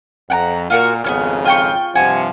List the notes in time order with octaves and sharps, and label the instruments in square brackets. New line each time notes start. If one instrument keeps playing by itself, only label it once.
[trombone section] F2 [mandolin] F#5 G5 A#5
[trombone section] A#2 [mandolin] F4 F#4 A#4
[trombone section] G#1 F2 C#3 [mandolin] B3 C#4 F6
[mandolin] F4 G5 C#6
[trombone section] G2 C3 F3 [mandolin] F#4 G#5